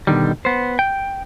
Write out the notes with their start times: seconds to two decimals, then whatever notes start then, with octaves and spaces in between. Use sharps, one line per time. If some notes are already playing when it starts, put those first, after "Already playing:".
0.07 B2 D3 D#3 G3
0.45 B3 C5
0.79 G5